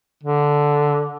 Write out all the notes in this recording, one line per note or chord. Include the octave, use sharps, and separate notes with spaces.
D3